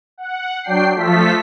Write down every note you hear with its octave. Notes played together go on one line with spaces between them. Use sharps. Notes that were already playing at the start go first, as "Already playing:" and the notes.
F#5
F#3 D4 G5 C7
F3 A3 F4 A4 B6